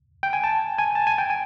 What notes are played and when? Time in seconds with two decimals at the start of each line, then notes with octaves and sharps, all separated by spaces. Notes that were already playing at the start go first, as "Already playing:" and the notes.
0.23 G5
0.33 G#5
0.44 A5
0.78 G#5
0.95 A5
1.07 G#5
1.18 G5
1.30 G#5